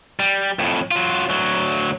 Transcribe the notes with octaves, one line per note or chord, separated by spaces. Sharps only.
G3
F2 A2
F#3 F4
D2 F#3